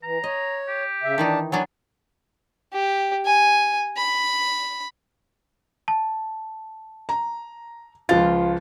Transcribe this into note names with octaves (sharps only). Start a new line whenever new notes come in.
E3 A#5
C#5 D#5
G4
C#3 E5
D#3 E3 D4 D#4 A5
F#3 B3 D4 C#5 G#5
G4
G#5
B5
A5
A#5
C#2 F3 F4 A6